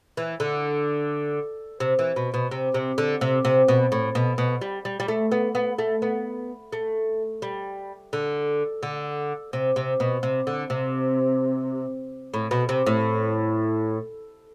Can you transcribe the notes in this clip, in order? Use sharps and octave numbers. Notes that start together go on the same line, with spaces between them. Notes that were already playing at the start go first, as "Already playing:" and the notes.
E3
D3
C3
E3
B2
B2
C3
C3
D3
C3
C3
B2
A2
B2
B2
G3
G3
G3
A3
B3
B3
A3
B3
A3
G3
D3
D3
C3
C3
B2
C3
D3
C3
A2
B2
C3
A2